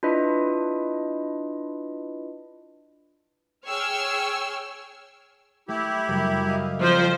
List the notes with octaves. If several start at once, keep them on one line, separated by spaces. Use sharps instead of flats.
D4 E4 F4 B4 D#5
G#4 C#5 G5 E6 F6
A3 E4 G4
F#2 C#3 G3
D#5 F5
F2 F3 C5